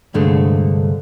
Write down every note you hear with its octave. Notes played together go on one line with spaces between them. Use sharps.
C2 G2 D3 G#3 A3